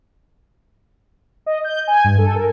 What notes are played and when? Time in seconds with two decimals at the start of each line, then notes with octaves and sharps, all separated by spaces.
1.46 D#5
1.64 G6
1.87 G#5
2.04 G2
2.18 A4
2.35 A#4